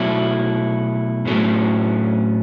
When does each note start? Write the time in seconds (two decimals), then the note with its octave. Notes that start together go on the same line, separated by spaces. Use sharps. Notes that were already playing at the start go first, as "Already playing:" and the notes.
Already playing: B2 F#3 A3 E4
1.25 A2 F#3 A3 C#4